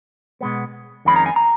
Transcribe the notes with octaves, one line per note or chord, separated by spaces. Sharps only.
B2 G#3 B3
F2 D#3 G#3 C#4 B5
A#5
G#5
A#5